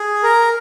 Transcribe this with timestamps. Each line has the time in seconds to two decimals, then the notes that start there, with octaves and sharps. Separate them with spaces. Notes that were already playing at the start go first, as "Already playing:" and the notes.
Already playing: G#4
0.23 A#4